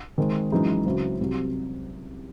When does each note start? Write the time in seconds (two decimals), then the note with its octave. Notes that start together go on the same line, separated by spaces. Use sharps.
0.18 D#3 G#3 C4
0.52 F#2 E3 G#3 D#4 G#4
0.86 C#2 C#3 F#3 C4 E4
1.20 C2 C3 F#3